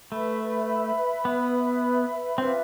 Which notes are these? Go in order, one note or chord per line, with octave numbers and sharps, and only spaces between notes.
A3 B4 E5 B5
B3
C4 D4 F4 B4 E5